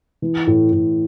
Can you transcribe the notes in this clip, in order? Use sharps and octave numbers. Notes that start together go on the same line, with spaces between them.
E3
A2
A2